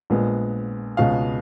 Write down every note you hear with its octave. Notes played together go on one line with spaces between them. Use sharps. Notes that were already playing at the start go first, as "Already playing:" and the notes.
A#1 A#2 G#3 B3
C#2 B2 G#3 F5